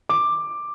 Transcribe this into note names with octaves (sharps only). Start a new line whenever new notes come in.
D6